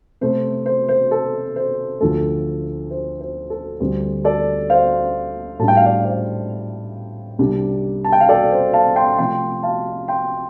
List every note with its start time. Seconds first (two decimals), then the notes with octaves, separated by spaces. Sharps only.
0.21 C3 A3 C4 C5
0.66 C5
0.88 C5
1.11 A4
1.56 C5
2.00 D2 D3 F3 A3 A4
2.91 C5
3.21 C5
3.50 A4
3.80 D2 D3 G3 C4
4.25 A4 D5
4.70 C5 F5
5.59 A2 G3 D4 A5
5.68 G5
5.77 F5
5.85 D5 G5
6.04 C5 F5
7.39 C2 C3 G3 D4
8.04 A5
8.12 G5
8.21 F5
8.29 A4 D5
8.51 C5
8.73 F5 A5
8.96 G5 C6
9.18 C3 F3 A3 G5 C6
9.63 F5 A5
10.08 G5 C6